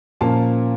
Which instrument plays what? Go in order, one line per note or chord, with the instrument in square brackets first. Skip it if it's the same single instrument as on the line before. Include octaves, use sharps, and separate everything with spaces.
[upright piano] A#2 F3 A#3 C#4 F5 A5